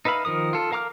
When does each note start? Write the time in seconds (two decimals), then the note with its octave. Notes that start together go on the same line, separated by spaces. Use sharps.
0.05 D#4 B4 E5 F5 B5
0.25 D#3 F3 A#4 D#6
0.53 F4 A4
0.72 A#4 F5 A#5 D6 F6